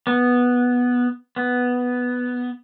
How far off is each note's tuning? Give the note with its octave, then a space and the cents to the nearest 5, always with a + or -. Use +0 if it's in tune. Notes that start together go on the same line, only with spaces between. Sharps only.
B3 -5
B3 +0